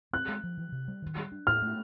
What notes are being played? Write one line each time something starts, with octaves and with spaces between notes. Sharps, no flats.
C4 F#6
G#3
F3
E3
C3
G3
D#3
G3
D4
A2 F6
A3